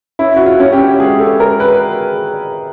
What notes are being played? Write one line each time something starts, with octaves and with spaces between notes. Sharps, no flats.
C#4 E4
F#4
F4
C#4
G4
G#3 G#4
A4
G#3 A#4
B4